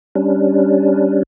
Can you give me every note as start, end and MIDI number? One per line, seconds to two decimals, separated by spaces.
0.15 1.23 55
0.15 1.23 61
0.15 1.23 62